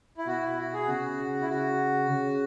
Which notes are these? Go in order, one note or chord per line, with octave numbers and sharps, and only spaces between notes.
E4
B2 F#4
E4
F#4
G#4
C#3 F#4
E4
F#4
C#3